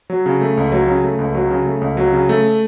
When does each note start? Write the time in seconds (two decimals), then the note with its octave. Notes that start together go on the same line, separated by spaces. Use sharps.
0.10 F#3
0.26 C#3
0.41 A3
0.57 C#2
0.72 F#3
0.88 C#3
1.04 A3
1.19 C#2
1.35 F#3
1.51 C#3
1.66 A3
1.82 C#2
1.97 F#3
2.13 C#3
2.29 A3